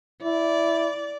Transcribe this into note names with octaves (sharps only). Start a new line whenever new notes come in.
E4 D5